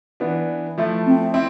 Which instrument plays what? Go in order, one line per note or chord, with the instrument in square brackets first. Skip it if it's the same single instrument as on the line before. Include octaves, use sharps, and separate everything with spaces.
[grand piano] E3 B3 D4
F3 A3 E4
[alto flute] C4
[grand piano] C4 E4